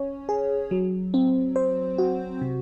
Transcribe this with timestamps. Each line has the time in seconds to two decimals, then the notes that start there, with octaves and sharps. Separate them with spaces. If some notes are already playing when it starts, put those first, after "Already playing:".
Already playing: C#4 C#5
0.29 G#4
0.71 F#3
1.14 C4
1.56 C5
1.98 F#4
2.41 C3